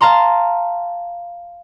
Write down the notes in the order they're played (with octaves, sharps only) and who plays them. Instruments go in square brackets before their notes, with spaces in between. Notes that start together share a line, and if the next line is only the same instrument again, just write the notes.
[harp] F5 A5 A#5 C6